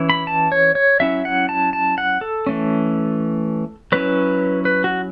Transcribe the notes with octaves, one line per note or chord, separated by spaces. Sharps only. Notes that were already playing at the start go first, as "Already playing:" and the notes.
Already playing: E3 C#4 E4
B5
A5
C#5
C#5
F#3 C#4 E4 E5
F#5
A5
A5
F#5
A4
E3 A3 C#4
F#3 C#4 E4 B4
B4
F#4